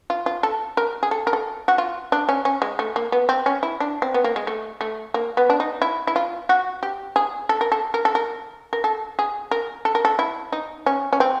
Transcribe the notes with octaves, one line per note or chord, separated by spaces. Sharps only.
F4
F4
A4
A#4
G#4
A4
A#4
A4
F#4
F4
D4
C#4
C#4
G#3
A3
A#3
B3
C4
C#4
E4
D4
C4
B3
A#3
G#3
A3
A3
A#3
B3
D4
D#4
E4
E4
F4
F#4
G4
G#4
A4
A#4
A4
A#4
A4
A#4
A#4
A4
G#4
A#4
A4
A#4
A4
E4
D#4
C#4
C#4
C4